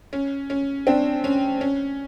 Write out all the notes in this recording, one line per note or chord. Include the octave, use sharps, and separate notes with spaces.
C#4
C#4
C4 D4
C#4
C#4